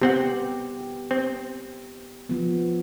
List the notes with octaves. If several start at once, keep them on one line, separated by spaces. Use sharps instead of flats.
C3 B3 C4 G4 F#5
C4
F3 B3